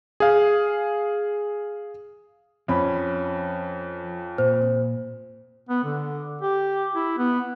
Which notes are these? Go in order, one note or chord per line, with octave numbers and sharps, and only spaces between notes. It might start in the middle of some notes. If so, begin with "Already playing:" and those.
G#4 F5
F2 F3 C#4 B5
A#2 C5
B3
D3
G4
E4
B3